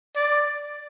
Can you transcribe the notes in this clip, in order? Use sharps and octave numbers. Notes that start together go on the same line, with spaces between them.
D5